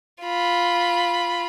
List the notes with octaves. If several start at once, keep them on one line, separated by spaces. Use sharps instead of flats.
F4 B5